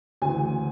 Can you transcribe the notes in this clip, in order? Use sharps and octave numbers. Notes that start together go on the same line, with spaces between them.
D2 C#3 E3 G#5